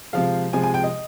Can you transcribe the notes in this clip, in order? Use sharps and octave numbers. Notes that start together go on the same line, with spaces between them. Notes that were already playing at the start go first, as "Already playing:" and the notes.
C3 F3 G#3 F5
C3 F3 G#3 G#5
G#5
G5
D#5